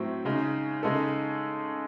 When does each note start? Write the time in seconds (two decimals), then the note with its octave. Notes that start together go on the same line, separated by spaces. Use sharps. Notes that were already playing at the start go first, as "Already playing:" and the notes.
Already playing: A2 F#3 C4 E4
0.25 C#3 G#3 D#4
0.83 C#3 G#3 D#4 A4